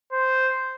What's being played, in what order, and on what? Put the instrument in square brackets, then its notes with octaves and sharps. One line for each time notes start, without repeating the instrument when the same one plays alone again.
[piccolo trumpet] C5